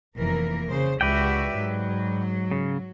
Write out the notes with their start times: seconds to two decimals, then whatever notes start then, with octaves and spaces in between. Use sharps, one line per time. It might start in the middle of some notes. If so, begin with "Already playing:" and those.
0.16 F1 E3 A#3 A#4
0.69 C#3 C5
1.01 C#2 F#4 G4 B4 D5 E5 G5
1.55 G#2 F#3
2.51 C#3